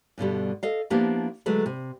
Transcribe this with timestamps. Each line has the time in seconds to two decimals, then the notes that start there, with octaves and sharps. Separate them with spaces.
0.18 G2 B2 D3 G3
0.63 A4 D#5 F5
0.90 F3 A#3 B3 D4 E4 G4
1.46 D3 F#3 G#3 A3 B4
1.66 C3